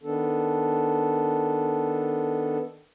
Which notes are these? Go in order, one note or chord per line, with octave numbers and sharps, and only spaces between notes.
D#3 B3 D4 A4